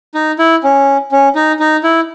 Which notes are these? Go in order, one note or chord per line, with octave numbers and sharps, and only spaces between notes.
D#4
E4
C#4
C#4
D#4
D#4
E4